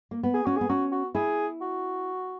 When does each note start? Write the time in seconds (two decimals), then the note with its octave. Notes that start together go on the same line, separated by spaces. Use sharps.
0.11 A#3
0.23 B3
0.34 G#4
0.45 C#4 F#4
0.56 G#4
0.61 B3
0.69 C#4 F#4
0.92 F#4
1.15 E4 G#4
1.61 F#4